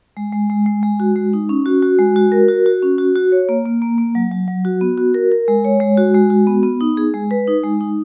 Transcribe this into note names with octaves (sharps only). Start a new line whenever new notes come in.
G#3
G#3
G#3
G#3
G#3
F#4
G#3
D#4
C#4
F#4
F#4
G#3
F#4
A#4
F#4
F#4
C#4
F#4
F#4
C#5
A#3
A#3
A#3
A#3
F#3
F#3
F#3
F#4
B3
F#4
A#4
A#4
G#3
C#5
G#3
F#4
G#3
F#4
B3
B3
D#4
G#4
G#3
B4
D#4
G#3
D#4